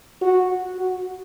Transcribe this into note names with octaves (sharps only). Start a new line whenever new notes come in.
F#4
F#4